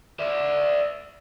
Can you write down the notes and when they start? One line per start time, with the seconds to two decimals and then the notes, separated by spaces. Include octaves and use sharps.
0.20 D5 E5